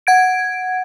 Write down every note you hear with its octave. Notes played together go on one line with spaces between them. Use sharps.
F#5 G#6 D7